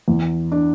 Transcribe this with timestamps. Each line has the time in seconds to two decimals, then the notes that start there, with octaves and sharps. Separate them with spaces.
0.08 E2
0.52 D4